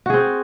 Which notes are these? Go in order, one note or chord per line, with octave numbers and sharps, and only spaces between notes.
C4 F#4 G#4